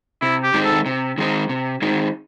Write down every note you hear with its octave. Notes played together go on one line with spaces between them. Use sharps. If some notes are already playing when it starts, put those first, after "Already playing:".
C3 E4
G4
D#3 G#3 C4 D#4
A4
C3
D#3 G#3 C4 D#4
C3
D#3 G#3 C4 D#4